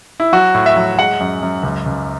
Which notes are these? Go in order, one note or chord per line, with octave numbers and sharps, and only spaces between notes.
E4
F#3 F#4
A2
E5
F#3
G#3 F#5
F#2
F#2
C#2
C#2